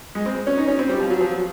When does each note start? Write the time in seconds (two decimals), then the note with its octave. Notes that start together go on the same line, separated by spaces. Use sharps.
0.15 G#3
0.26 C4
0.47 C#4
0.57 D#4
0.68 C#4
0.79 C4
0.89 G3
1.00 F3
1.10 F#3
1.21 F3
1.31 F#3